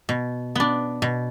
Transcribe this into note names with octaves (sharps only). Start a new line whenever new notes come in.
B2
B3 D4
B2